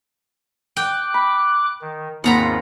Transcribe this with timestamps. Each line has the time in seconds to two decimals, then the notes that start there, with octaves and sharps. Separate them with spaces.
0.76 G5 D6 F#6
1.14 B5
1.81 D#3
2.24 D#2 G#2 C4 F4 F#5 A#5 B5